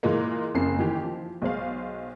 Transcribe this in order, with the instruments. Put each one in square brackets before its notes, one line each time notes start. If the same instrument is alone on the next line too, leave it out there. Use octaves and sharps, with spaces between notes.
[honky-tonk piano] A#2 E3 G#3 A#3
F#1 F2 C#3 A#3 C7
D#3 E3 G4
F3
B1 G#3 C5 F5